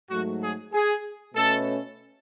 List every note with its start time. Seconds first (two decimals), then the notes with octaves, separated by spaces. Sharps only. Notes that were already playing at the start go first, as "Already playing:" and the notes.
0.10 G#2 F#3 A3 F#4
0.42 G#4
0.73 G#4
1.35 B2 A3 C#4 A4